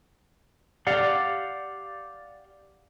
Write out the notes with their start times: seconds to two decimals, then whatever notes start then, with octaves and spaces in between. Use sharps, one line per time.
0.87 G4 D5 F5 F#5